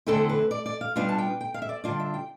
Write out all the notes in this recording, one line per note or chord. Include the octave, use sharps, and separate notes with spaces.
E2 D3 A3 C4 E4 A4
B4
D5
D5
F5
B2 G3 B3 D4 F4 F5
A5
G5
G5
F5
E5
D5
D3 G3 D4 F4 D5
E5
G5